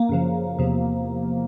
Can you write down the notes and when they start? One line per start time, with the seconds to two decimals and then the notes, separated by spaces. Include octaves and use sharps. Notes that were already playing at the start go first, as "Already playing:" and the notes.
Already playing: A#3
0.09 F#2 C#3 F3
0.59 E2 C3 F3